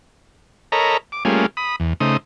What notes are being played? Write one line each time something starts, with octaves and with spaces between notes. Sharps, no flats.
A4 A#4 C#5 D#5 A#5 B5
D6
G3 A3 A#3 C#4 F4 G#4
B5 D#6
E2
C#3 A3 D#4 C5 D#6